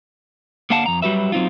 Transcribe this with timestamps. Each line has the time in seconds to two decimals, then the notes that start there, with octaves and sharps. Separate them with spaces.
0.70 D3 A#3 D4 F5 F#5 A5
0.86 F2 A#5
1.02 F#3 G3 F#4 B4 E5
1.32 F#3 C4 D#4 F4